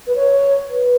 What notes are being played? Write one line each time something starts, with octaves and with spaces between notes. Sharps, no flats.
B4
C#5
B4